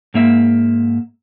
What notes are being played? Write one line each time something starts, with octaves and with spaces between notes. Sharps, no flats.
G#2 A#3 E5